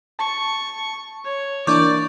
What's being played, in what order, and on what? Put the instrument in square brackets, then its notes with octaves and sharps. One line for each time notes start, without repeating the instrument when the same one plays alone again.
[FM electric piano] A5 [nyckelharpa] C#6
[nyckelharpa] C#5
[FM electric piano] E3 A#3 D4 [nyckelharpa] D5 [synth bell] C#6 D6 G6